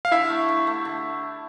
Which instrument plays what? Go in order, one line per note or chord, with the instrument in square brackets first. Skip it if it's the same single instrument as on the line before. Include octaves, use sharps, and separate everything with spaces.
[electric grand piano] F5
[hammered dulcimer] D3 [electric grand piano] E4 E5
[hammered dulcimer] A3
D3
A3
D3